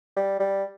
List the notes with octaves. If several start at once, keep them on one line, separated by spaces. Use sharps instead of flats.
G3
G3